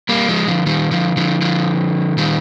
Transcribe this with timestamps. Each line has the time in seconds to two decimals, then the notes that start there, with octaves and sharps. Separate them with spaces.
0.09 G3 A#3
0.28 F3 G#3
0.48 D3 F3
0.66 D#3 G3
0.91 D3 F3
1.17 D3 F3
1.41 D3 F3
2.18 D#3 G3